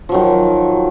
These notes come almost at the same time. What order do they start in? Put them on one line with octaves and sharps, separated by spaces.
F3 F#3 D#3